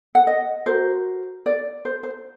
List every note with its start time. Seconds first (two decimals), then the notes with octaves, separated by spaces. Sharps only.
0.15 F#5
0.27 D#5
0.66 F#4 A#4 C5
1.46 D5
1.85 C5
2.03 C5